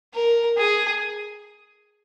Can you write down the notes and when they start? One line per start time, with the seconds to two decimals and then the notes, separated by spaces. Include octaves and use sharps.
0.14 A#4
0.58 G#4